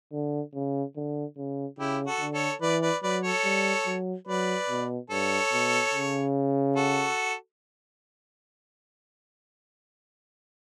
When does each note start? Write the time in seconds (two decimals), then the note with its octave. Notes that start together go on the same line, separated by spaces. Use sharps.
0.12 D3
0.55 C#3
0.96 D3
1.37 C#3
1.78 C#3 E4 G4
2.06 F#4 A4
2.21 D3
2.34 A4 C#5
2.61 E3 B4 D5
2.82 B4 D5
3.03 F#3 B4 D5
3.23 A4 C#5
3.44 G3
3.86 F#3
4.27 F#3 B4 D5
4.69 B2
5.10 G2 A4 C#5
5.52 B2
5.94 C#3
6.76 F#4 A4